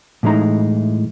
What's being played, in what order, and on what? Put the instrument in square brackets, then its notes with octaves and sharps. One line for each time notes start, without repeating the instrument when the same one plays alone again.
[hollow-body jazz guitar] A2 E3 G#3 D#4 A#5